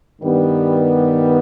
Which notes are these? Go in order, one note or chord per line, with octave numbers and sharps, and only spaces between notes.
G2 D#3 G3 B3